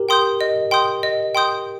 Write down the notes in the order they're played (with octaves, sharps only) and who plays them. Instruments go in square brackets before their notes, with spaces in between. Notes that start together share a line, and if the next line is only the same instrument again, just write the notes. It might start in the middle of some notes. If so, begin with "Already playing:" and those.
Already playing: [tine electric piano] G4 A#4
[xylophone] G5 C6 D#6 G6
D#5
G5 C6 D#6 G6
D#5
G5 C6 D#6 G6